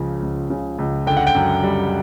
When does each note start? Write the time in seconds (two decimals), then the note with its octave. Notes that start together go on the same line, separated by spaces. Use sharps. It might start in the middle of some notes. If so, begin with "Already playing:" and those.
Already playing: C#2 C#3 F3
0.23 C#2
0.50 C#3
0.79 C#2
1.07 D3 G5
1.17 F#5
1.27 G5
1.35 F#2
1.63 G3